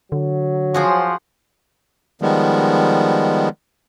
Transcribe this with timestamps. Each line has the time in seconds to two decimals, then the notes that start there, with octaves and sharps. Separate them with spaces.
0.12 D3 F#3
0.74 F3 F#4 G#4 C5
2.22 D#3 F3 G3 G#3 B3